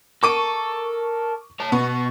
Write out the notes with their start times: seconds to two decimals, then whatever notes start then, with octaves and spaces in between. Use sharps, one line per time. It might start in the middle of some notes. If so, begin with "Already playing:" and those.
0.23 A4 A#4 C#6 D6 D#7
1.60 C#5 A5
1.72 B2 B3 C#6